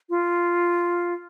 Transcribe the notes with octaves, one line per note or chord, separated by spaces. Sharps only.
F4